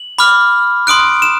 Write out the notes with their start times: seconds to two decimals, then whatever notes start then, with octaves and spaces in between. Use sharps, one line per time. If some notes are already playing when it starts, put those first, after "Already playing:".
Already playing: F#7
0.19 B5 D6 F6
0.87 C6 D#6 F#6 D7
1.22 E7